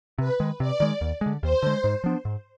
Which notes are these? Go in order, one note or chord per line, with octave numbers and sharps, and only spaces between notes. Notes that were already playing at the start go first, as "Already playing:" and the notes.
C3 B4
D#3 G#3
C3 D5
D#3 G#3
D#2
D3 G#3
D#2 C5
D3 G#3
G#2
F3 B3 D4
G#2